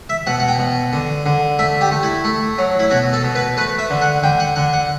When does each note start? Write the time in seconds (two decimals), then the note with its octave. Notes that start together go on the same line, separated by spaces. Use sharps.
0.09 E5
0.27 B2 F#5
0.40 F#5
0.48 G5
0.59 B2
0.93 D3
1.26 D3
1.59 A3 E5
1.81 G4
1.91 A3
2.03 E4
2.24 A3
2.58 F#3
2.79 E4
2.90 B2 F#4
3.13 A4
3.24 B2
3.35 B4
3.57 A3 B4
3.79 E5
3.90 D3
4.01 F#5
4.23 D3 G5
4.40 F#5
4.56 D3 F#5
4.73 F#5